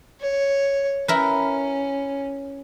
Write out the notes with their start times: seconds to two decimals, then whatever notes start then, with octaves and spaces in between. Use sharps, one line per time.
0.21 C#5
1.08 C#4 E4 A#4 B4